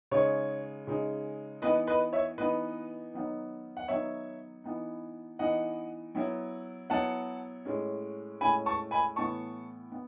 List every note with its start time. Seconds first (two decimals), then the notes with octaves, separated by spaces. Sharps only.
0.11 C#3 G#3 D#4 C#5
0.87 C#3 G#3 D#4
1.62 E3 B3 D#4 B4 D#5
1.87 B4 D#5
2.13 C#5 E5
2.38 E3 B3 D#4 B4 D#5
3.14 D#3 F#3 B3 D#4
3.77 F#5
3.88 D#3 F#3 B3 D#4 C#5 E5
4.64 E3 B3 D#4
5.39 E3 B3 D#4 D#5 F#5
6.15 F#3 B3 E4
6.90 F#3 B3 E4 F#5 A5
7.65 A2 G#3 C#4
8.41 A2 G#3 C#4 G#5 B5
8.66 A5 C#6
8.91 G#5 B5
9.16 A2 E3 B3 A5 C#6
9.92 B3